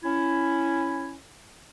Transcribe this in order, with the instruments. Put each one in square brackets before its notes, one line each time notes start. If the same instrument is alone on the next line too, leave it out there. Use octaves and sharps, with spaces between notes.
[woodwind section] C#4 E4